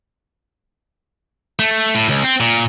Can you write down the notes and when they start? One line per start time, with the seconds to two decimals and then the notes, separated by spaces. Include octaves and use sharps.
1.59 A3
1.95 A2
2.09 C#2
2.24 C4
2.40 A#2